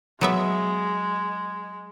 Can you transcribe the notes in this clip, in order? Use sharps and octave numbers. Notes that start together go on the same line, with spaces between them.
F#3 G#3 B3 E5